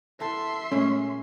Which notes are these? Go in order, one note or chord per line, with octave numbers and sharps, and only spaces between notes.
E2 A4 E5 A5 C6
A#2 G#3 A3 C#4